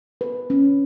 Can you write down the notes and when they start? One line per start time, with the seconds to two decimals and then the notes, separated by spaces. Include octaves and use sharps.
0.21 B4
0.50 C#4